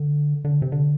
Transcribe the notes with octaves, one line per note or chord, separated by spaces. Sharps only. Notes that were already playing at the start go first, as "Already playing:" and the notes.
Already playing: D3
D3
C3
D3